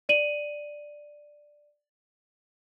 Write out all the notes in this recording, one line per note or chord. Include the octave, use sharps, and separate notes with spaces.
D5 D#7 F#7